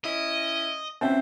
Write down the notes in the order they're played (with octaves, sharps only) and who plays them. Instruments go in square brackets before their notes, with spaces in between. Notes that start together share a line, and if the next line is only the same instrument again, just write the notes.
[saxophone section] C#4 E4 [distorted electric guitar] D#5
[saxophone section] E3 F#3 C5 [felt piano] C4 E5 [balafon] C#4